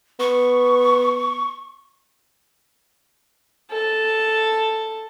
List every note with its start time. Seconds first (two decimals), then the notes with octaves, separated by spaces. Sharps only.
0.20 B3 C#6
3.71 A4